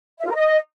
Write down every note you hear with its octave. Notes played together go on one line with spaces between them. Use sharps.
E5
F4
A#4
D#5